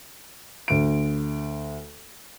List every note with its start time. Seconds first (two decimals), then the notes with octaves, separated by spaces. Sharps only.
0.68 D2 D7